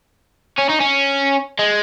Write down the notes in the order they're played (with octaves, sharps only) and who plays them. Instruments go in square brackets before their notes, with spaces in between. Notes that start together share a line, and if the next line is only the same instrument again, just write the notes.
[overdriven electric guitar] C#4
D#4
C#4
G#3